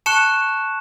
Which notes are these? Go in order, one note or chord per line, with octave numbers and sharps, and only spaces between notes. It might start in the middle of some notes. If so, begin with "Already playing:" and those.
A5 C#6 F#6 C#7 E7